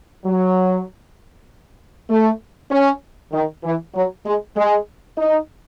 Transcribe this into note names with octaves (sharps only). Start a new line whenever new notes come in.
F#3
A3
C#4
D#3
E3
F#3
G#3
G#3
D#4